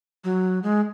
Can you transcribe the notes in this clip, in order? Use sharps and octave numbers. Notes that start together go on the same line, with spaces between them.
F#3
G#3